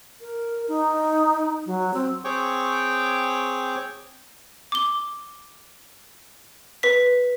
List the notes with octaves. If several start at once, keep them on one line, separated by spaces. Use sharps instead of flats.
A#4
D#4
F#3
C4
C4 G#4 C#5 G5 C#6 D6
D6 G7
B4 B6